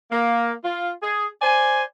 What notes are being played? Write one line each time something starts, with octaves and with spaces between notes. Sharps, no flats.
A#3
F4
G#4
C5 D5 G#5